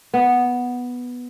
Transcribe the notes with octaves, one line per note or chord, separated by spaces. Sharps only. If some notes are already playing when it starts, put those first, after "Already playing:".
B3